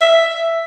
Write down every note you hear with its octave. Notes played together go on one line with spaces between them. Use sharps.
E5